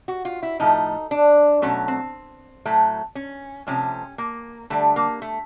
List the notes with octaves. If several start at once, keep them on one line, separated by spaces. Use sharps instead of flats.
F#4
F4
E4
A2 F3 A3 D#4
D4
B2 F#3 A3 C#4
C4
A2 F#3 A3
C#4
C3 F3 A3 C#4
A#3
D3 G3 A3
A#3
A3